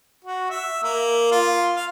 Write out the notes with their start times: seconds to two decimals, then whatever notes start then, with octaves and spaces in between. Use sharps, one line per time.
0.24 F#4
0.50 E5
0.83 A#3
1.32 F4
1.76 F5